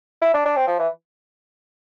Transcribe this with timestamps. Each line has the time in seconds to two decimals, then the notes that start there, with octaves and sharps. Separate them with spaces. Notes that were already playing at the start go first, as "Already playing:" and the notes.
0.22 E4
0.34 D4
0.45 D4
0.57 C4
0.67 F3
0.79 E3